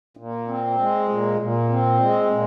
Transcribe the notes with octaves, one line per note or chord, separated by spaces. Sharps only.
A#2
C4
G#3
A#2
A#2
C4
G#3
A#2